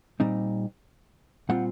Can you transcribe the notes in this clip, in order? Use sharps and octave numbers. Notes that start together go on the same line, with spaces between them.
A#2 G3 C4 D#4
A#2 G3 C4 F4 F#5